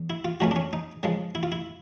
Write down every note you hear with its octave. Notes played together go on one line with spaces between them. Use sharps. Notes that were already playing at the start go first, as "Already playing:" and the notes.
Already playing: E2
E4
F4
F2 C#3 F3 A3 C#4 F#4
D4
C#4
D#4
C#3 F3 G#3
E4
F4
E4